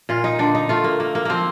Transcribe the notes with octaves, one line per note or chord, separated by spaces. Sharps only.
A#2 F4
D#4
D3 D4
D#4
A3 F4
A#3
A#3
A#3
F3 A#3 C4